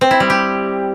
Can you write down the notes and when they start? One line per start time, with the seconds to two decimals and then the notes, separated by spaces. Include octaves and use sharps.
0.01 C4
0.11 E4
0.20 G3
0.30 G4